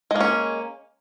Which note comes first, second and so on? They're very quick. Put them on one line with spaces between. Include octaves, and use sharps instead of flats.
G#3 A#3 C#4